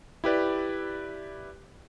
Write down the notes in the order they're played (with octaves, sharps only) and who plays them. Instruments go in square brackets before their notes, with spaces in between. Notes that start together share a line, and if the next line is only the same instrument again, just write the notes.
[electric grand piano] E4 G4 B4 D5